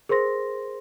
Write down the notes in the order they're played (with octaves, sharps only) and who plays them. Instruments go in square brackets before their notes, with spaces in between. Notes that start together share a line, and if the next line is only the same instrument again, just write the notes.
[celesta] G#4 A#4 C5 C6 A#6